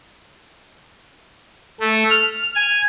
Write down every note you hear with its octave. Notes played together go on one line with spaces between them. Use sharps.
A3
F6
G#5